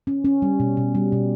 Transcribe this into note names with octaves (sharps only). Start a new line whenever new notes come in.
C#4
C#4
G3
B2
B2
G3
B2